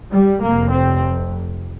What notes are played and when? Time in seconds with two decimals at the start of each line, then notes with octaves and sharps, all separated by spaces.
0.10 G3
0.41 F1 F2 C3 A#3
0.71 C4